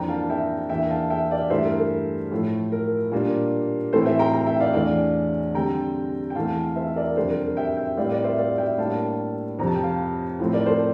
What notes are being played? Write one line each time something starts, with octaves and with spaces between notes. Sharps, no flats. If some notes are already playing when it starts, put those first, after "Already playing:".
Already playing: F2 E3 A#3 D4 G5 A#5
F5 A5
E5 G5
E2 E3 A#3 D4 E5 G5
F5 A5
E5 G5
D5 F5
G2 E3 A3 D4 C5 E5
A#4
A4
A2 F3 A3
A#4
A#2 G3 A#3 D4
A2 E3 A3 C4 A4 C5
C5 E5
G5 A#5
G5 A#5
E5 G5
D5 F5
E2 E3 A3 D4 D5 F5
D3 G3 C4 G5 A#5
G5
E2 E3 A3 C4 F5 A5
F5
C5 E5
E5
A#4 D5
F2 C3 G3 D4 A4 C5
A#4
A#4
E5 G5
E5 G5
A2 G3 C4 D5 F5
A#4 D5
C5 E5
D5 F5
E5 G5
A2 G3 A#3 D4 F5 A5
F2 C3 F3 A#5
A5
G5
F5 A5
A2 F3 A3 C4
A#4 D5
A4 C5